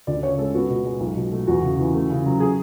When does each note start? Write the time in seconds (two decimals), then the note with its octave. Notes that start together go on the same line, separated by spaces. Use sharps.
0.07 D2 D5
0.23 C#3 C#5
0.38 G#3 A4
0.54 B3 F#4
0.70 B2
0.85 G#3
1.00 B1
1.16 B2
1.32 A3
1.47 E2 F#4
1.62 C#3
1.79 E3
1.94 A3
2.10 C#3
2.26 F#3
2.40 G#4